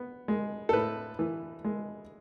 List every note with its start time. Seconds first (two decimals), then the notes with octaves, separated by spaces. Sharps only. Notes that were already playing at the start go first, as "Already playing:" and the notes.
Already playing: B3
0.28 G#3
0.69 A4
0.73 A2 B4
1.19 E3
1.64 G#3